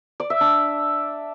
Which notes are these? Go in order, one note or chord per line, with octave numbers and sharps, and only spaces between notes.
D5
E5
D4